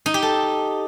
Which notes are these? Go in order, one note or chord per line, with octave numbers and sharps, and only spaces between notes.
D#4
G4
A4